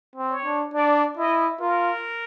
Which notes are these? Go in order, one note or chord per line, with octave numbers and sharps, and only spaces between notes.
C4
C#5
D4
D4 D5
E4 D#5
F4 A#4